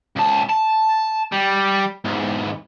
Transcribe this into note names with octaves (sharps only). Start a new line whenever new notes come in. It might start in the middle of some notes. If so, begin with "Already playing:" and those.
C#2 A5
A5
G3
E2 G#2